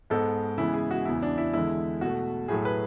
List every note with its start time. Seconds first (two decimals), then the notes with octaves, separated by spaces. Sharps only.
0.10 G#2 G#3 B3 A4
0.58 C#3 E3 G#3 B3 E4
0.74 G#4
0.91 F#4
1.05 E2 C#3 E3 B3 E4
1.22 D4
1.38 E4
1.53 E2 D3 G#3 E4
2.01 B2 A3 F#4
2.48 A2 F#3 A3 G#4
2.65 B4